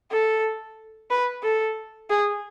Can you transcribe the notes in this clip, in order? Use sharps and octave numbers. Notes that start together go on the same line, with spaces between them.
A4
B4
A4
G#4